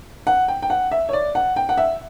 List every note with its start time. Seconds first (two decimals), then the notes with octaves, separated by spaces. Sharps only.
0.27 F#5
0.48 G5
0.62 G5
0.70 F#5
0.92 E5
1.09 C#5
1.13 D5
1.35 F#5
1.56 G5
1.69 F#5
1.77 E5